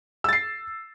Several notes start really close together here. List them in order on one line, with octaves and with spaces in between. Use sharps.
E6 A6 C7